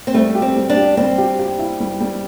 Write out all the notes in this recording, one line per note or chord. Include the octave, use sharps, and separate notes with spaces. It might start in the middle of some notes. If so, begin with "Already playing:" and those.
C4
G3 A3
G4
C4
G3
D4
G4
G3 C4
G4
G4
E4
G3
G3